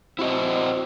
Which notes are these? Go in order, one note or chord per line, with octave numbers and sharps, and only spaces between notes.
C4 E4 F#4 D#5